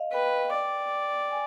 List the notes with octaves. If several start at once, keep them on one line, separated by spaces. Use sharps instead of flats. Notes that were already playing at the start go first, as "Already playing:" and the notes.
Already playing: D#5 F5
B4 G5
D5
G#5